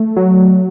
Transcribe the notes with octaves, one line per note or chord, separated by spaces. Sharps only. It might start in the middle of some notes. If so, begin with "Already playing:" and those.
Already playing: A3
F#3